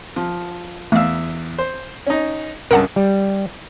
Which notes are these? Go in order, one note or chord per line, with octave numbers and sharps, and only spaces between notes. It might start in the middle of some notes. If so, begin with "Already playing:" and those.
F3
E2 A3 E5 F5
C5
C#4 D#4
C#2 G2 A#4 F#5 A5
G3